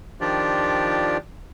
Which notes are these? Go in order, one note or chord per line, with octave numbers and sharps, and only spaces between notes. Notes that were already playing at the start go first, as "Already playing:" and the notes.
D#3 F3 D4 F4 G4 D5